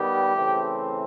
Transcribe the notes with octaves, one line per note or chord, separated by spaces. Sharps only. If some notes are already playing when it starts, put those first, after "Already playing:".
Already playing: D#3 G3 B3 G4
C#3 E3 A3 C4